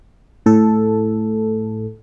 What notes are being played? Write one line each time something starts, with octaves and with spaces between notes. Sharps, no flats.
A2 A4